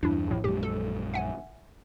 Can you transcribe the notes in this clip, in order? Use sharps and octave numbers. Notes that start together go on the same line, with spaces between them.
E2 G2 G3 D4 E4
A#1 A2
A#1 F#2 G#3 G4
A4
E5 F#5 G#5